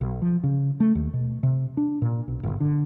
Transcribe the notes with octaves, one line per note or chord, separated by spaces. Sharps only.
B1
F3
C#3
A3
D#2
B2
C3
D4
A#2
B1
G1
D3